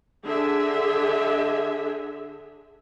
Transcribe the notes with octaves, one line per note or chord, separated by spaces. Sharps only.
D3 G#4 E5